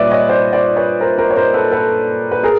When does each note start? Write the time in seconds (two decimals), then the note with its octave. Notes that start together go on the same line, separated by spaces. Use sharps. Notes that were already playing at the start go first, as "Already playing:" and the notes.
Already playing: A#2 G3 B4 C#5 D5 E5
0.11 C#5 D#5
0.29 C5 D5
0.53 C5 D5
0.76 B4 C#5
1.01 A#4 C5
1.18 A#4 C5
1.30 C#5
1.36 A#4 C5
1.54 A4 B4
1.71 A4 B4
2.31 B4
2.43 G#4 A#4